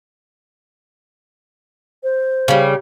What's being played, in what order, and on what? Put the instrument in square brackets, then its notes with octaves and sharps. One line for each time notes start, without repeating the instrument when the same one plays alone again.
[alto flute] C5
[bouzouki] C#3 G3